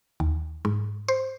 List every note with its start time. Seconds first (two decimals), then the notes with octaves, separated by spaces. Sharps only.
0.20 D#2
0.65 G#2
1.08 C5